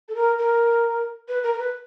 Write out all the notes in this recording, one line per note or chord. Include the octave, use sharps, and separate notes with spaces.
A4
A#4
A#4
B4
A#4
A#4
B4